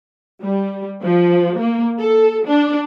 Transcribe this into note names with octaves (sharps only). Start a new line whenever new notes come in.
G3
F3
A#3
A4
D4